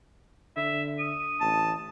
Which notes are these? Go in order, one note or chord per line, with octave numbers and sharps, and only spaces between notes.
D3 E5
D#6
A1 A5